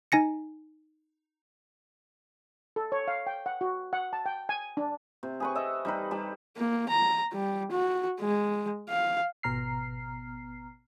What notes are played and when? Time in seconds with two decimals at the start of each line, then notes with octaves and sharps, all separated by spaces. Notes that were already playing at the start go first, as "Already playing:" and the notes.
0.12 D#4 G#5 A#6 C#7
2.76 A4
2.92 C#5
3.08 F5
3.27 G5
3.46 F#5
3.61 F#4
3.93 F#5
4.13 A5
4.26 G5
4.49 G#5
4.77 D4
5.23 C3
5.40 G#4 B4 C#6
5.55 A4 D#5 E5
5.85 G3 D#4 B4
6.11 G3 A5
6.57 A#3
6.89 A#5
7.33 G3
7.71 F#4
8.20 G#3
8.89 F5
9.43 G#1 B2 B3 A#5 F6 C7